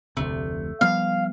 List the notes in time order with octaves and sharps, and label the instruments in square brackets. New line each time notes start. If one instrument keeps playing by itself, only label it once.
[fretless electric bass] F1 D2 C3 [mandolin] A3
[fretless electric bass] F3 G3 B3 [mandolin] F5